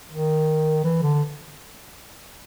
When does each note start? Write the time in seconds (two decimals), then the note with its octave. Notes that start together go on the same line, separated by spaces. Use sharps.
0.11 D#3
0.84 E3
1.03 D3